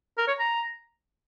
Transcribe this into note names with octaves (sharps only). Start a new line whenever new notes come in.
A#4
C#5
A#5